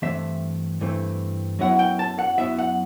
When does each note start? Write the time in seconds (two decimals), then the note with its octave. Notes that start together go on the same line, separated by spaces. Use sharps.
0.02 G2 E3 A3 C4 E5
0.81 G2 E3 A3 C4
1.59 F#2 F#3 B3 E4 F#5
1.79 G5
1.99 A5
2.19 F#5
2.38 F#2 F#3 B3 E4 E5
2.58 F#5